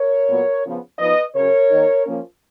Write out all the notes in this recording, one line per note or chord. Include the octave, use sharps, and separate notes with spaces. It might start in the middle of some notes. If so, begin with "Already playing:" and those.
Already playing: A#4 C#5
A#2 F#3 B3
C#3 F3 B3
F3 B3 D#4 B4 D#5
C#3 F#3 C#4 A#4 C#5
D#3 A#3 D#4
F3 A#3 C#4